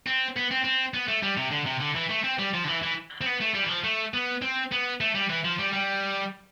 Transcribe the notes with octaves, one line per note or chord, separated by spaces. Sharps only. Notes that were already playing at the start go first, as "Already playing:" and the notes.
C4
B3
C4
C4
B3
A3
G3
C3
D3
C3
D3
E3
A3
C4
G3
F3
D3
E3
E3
C4
B3
A3
G3
E3
F3
A3
B3
C4
B3
A3
G3
E3
F3
G3
G3